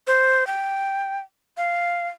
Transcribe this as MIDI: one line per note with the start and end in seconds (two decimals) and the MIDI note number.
0.07 0.47 72
0.47 1.20 79
1.57 2.08 77